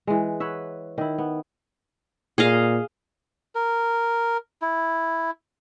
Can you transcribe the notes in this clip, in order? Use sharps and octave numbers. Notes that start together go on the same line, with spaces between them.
E3 G#3
B4 C#5 E5 F#5
D#3 E4
B3
A#2 G#4 D#5 F5
A#4
E4